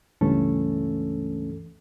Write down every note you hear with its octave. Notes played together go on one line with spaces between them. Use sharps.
C#2 G2 E3 A3 C#4 A4